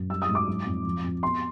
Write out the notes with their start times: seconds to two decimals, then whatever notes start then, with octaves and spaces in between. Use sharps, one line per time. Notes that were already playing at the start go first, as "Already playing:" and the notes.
Already playing: F#2
0.10 G3 E6
0.22 D#6
0.29 G#2
0.35 D6
0.47 F#3
0.66 F2
0.85 F3
1.04 F2
1.22 B3 C6